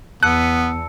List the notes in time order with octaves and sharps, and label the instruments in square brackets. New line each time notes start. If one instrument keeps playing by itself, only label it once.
[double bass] E2 [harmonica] B3 [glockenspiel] A5 E6 C#7 [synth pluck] F#6